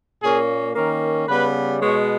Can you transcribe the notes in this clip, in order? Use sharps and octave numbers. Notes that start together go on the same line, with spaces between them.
A#2 A#3 C#4 G#4
D#3 A#3 C#4 A#4
C#3 G3 B3 B4
B2 G#3 B3 C#5